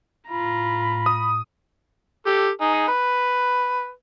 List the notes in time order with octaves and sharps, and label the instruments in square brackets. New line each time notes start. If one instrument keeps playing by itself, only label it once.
[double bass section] A2 [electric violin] F4 A#5 [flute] B5
[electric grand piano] D#6
[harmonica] G4 A4
D#4 G#4
B4